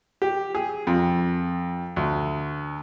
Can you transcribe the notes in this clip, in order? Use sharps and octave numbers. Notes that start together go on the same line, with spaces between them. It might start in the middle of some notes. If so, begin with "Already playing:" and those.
G4
G#4
F2
D2